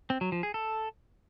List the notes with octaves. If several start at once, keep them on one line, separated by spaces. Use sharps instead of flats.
C4
F#3
F3
G#4
A4